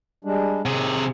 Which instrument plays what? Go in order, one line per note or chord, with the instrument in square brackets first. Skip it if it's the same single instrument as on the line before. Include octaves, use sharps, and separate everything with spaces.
[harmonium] G3 G#3 D4
[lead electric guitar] C3 G#4 [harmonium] D#3